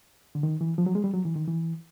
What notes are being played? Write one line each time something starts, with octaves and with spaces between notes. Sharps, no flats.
D3
D#3
E3
F3
F#3
G#3
G3
F#3
E3
D#3
E3